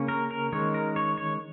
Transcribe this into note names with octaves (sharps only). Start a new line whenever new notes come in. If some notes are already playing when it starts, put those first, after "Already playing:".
Already playing: C#3 A#3 C#4
A#4
A#4
D#3 G#3 C#4 C#5
A#4
C#5
C#5